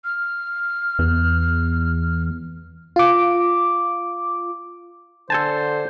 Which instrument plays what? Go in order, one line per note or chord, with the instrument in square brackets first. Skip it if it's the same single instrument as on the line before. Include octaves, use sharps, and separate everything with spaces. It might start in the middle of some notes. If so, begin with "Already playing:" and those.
[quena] F6
[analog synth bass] E2
[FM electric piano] F4 D6
[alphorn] D3 [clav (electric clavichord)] A4 G#5 A5 [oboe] C5